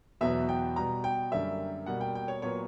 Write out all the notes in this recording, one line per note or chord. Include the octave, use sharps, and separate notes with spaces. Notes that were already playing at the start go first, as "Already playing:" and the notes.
E2 B2 F#3 B3 E5
G5
B2 G3 B3 A#5
G5
F#2 D3 G3 A#3 E5
B2 G3 A#3 F#5
G5
G5
C#5
A#2 F#3 B3 C#5